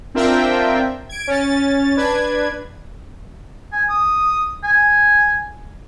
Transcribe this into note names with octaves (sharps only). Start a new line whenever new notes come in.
C4 D4 F4 A#4 E5 G5
G#6 D7
C#4 A6
D4 B4 G#6
G#5
D#6
G#5